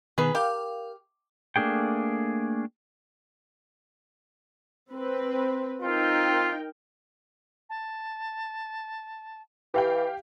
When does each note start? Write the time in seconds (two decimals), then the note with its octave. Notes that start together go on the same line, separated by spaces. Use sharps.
0.18 B2 D#3 B3 G#4 B4
0.35 G4 A#4 F5 G5
1.56 A3 A#3 D4 G#4 G5
4.91 C4 B4
5.82 C4 D#4 F4 A#4 G5
7.69 A5
9.74 E3 G4 F5 G5